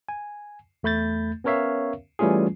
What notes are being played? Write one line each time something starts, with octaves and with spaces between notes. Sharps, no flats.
G#5
E2 A3 B5 G6 A6
B3 C#4 A#4 C#5 E5 F5
E3 G3 A3 C#4 F4 G#4